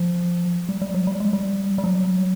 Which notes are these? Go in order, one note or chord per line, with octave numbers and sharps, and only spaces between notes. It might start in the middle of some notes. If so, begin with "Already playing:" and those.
Already playing: F3
G3
G3
F#3
G3
G#3
G3
G3
F#3